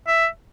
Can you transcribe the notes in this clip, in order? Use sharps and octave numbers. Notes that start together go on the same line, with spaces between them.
E5